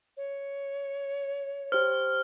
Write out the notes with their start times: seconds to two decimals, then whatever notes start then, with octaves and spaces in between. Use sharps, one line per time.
0.17 C#5
1.72 G4 C5 F6